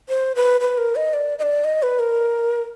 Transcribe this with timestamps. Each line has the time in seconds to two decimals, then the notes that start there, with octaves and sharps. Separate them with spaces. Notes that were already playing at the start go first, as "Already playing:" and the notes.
0.09 C5
0.36 B4
0.61 B4
0.78 A#4
0.96 D#5
1.14 D5
1.39 D#5
1.43 D5
1.64 D#5
1.83 B4
1.99 A#4